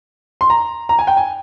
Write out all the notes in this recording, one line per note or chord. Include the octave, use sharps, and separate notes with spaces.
C6
A#5
A#5
G#5
G5
G#5